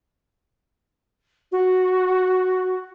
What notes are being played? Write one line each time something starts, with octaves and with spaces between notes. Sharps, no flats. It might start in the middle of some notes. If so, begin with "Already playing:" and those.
F#4